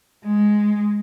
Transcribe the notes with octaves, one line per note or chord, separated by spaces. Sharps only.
G#3